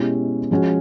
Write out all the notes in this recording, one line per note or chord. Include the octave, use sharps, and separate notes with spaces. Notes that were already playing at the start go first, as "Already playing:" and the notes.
Already playing: B2 G#3 C#4 E4 G4
F3 G#3 C#4 F#4